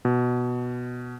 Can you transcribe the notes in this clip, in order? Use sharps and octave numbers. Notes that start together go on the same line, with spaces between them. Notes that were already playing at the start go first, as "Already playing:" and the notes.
B2